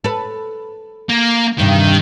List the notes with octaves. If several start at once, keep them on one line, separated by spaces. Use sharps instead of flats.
A4 B4
A#3
E2 G2 C3 D#3